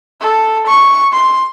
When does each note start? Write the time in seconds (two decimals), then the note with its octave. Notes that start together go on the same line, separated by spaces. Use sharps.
0.21 A4
0.67 C#6
1.13 C6